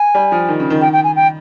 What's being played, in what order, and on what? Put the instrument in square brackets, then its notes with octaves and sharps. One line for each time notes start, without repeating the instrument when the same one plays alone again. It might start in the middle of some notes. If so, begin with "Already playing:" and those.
Already playing: [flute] G#5
[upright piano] G3
F3
D#3
C#3
D#3
[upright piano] D#3 [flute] G5
[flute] G5
G#5
G5